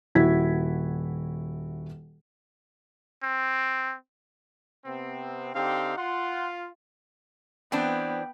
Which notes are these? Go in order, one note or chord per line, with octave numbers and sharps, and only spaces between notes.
D#1 E4 F#4 G#6 B6
C4
C3 B3 C4
D3 C4 D#4 G4 F5
F4 F#5 C6
E3 B3 C4 D4 G5